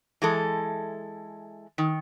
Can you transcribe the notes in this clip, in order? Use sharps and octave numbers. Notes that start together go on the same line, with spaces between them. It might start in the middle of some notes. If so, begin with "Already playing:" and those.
E3 G#3 A4
D#3